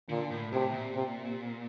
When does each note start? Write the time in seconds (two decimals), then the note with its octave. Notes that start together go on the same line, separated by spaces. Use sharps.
0.09 A#2 D3
0.31 A2
0.52 A2 C3
0.74 A#2
0.95 C3